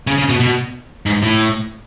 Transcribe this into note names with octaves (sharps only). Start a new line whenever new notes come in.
C#3
C#3
B2
B2
G#2
A2